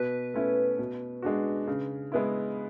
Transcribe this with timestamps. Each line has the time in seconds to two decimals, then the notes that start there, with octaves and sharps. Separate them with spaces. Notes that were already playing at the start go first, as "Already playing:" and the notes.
Already playing: B2 B4
0.34 A3 C#4 E4
0.79 B2
1.22 G#3 D4 F#4
1.67 C#3
2.12 G#3 B3 E4